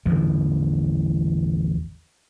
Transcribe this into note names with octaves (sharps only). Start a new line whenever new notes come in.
A1 E2 D3 E3